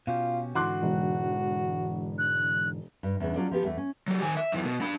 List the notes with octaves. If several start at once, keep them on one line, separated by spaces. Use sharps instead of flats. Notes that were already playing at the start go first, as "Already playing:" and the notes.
B2 C#4 F4 G4
G#2 D3 E3 F#4 C6 D6 F#6
E1
F#6
G2
E2 C#3 D4
F#3 C#4 F4 A4 D5
F3 B3 G4 A4
E2 A3
C#4
F#3 G4
D#3 G#5
E5
F#2 E3
B2
D4 B5